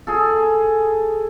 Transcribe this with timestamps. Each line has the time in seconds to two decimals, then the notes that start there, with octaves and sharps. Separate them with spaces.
0.07 G#4 A4